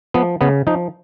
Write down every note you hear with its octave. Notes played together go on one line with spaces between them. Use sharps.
F3 B3
C#3 B3
F3 D#4